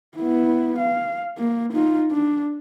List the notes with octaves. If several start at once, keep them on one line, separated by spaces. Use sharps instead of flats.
B3 E4
F5
A#3
D#4 F4
D4